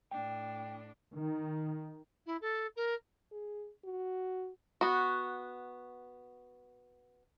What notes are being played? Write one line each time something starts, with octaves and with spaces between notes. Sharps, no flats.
A2 D4 G5
D#3
E4
A4
A#4
G#4
F#4
B3 F#4